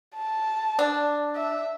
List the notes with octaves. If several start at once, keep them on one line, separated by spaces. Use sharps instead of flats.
A5
D4
E5